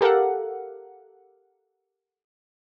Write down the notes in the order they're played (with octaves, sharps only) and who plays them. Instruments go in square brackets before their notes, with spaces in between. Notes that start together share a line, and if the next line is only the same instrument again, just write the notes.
[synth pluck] G4 A4 A#4 F5 F#5